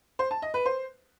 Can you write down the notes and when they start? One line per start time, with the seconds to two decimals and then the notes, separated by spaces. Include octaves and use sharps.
0.19 C5
0.31 A5
0.42 D#5
0.54 B4
0.66 C5